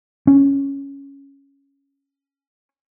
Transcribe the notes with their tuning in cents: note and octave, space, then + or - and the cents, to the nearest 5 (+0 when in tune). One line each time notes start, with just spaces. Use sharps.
C#4 +0